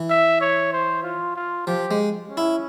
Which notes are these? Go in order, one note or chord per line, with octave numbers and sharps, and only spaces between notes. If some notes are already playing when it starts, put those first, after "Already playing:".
Already playing: E3
E5
C#5
C5
F4
F4
F3 G4
G#3
C#4
E4